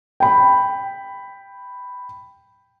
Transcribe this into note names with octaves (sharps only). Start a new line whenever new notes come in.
G5 B5